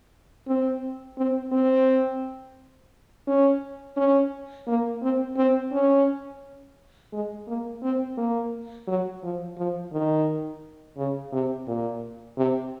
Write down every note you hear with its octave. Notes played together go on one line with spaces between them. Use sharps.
C4
C4
C4
C#4
C#4
A#3
C4
C4
C#4
G#3
A#3
C4
A#3
F#3
F3
F3
D#3
C#3
C3
A#2
C3